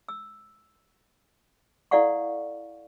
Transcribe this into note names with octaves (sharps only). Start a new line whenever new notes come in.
E6
E4 A4 D5 F5 F#5 C#6